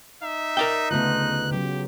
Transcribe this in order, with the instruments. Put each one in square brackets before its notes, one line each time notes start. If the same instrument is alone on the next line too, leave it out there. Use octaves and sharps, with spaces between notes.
[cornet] D#4 [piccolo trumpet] E5
[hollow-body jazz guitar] A#4 D5 G5
[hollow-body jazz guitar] D2 A3 [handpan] C#3 B3 F4 [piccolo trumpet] F#6
[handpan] C#3 F#3 [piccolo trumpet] G4